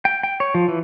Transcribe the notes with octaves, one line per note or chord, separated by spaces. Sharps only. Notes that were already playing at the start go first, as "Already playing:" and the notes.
G5
G5
C#5
F3
E3